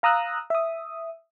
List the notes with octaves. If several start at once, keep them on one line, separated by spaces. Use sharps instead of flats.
F5 A#5 D#6 E6 F#6
E5 D#6